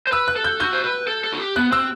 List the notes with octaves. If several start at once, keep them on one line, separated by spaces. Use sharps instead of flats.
C5
B4 E6
F#6
A4
G6
F#4 G6
C5
B4
A4
A4
F#4
G4
B3 F#6
C4 E6